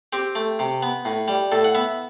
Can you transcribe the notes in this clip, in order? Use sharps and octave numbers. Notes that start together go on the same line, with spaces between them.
C4 G4
A3
C3
B3
A2
G3
A2 A4
F#5
B3 E5